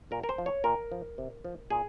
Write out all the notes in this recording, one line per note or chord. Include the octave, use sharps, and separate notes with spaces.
A#2 A#4
A#4
C5
F3
C#5
A#2 A#4
F3
C3
F3
A#2 G#4